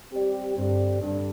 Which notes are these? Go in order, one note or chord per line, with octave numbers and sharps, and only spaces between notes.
G3 C4 G4 D5
G2 D3 C4 G4 D5
G2 D3 G3 D4